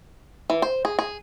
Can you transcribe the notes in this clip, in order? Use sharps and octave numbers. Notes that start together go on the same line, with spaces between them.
E3
C5
G#4
G#4